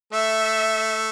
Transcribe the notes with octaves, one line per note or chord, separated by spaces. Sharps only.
A3 E5